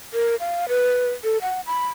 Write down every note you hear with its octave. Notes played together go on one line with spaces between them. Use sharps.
A#4
F5
B4
A4
F#5
B5